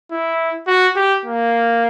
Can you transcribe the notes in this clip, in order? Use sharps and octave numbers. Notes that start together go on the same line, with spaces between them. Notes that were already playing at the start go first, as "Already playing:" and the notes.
E4
F#4
G4
A#3